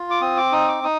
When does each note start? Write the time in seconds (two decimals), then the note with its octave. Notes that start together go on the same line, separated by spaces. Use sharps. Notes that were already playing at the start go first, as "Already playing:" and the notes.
Already playing: F4
0.10 D6
0.21 C4 D#6
0.37 D6
0.52 D#4 D#6
0.68 D6
0.84 D#4 D#6